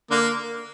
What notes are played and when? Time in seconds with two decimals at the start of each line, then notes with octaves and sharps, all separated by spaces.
0.11 D3 A#3